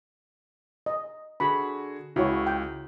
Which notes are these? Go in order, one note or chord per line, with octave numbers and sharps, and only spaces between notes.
D#5
D3 F#4 G#4 B5
C#2 E4 F#4 C#5
G5